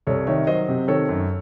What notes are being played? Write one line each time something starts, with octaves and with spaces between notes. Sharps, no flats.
C2 A4 C#5
D#3 C#5 E5
F#3 C5 D#5
C3
D#3 A4 C#5
F#2